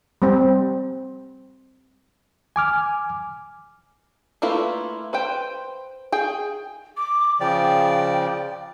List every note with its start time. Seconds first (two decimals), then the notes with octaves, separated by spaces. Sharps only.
0.22 G3 C4
2.56 G#5 D6 F6
4.42 A3 A#3 E4 F4 B4
5.13 B4 C5 G5
6.12 G#4 G5
6.97 D6
7.41 C#3 F3 D5 G5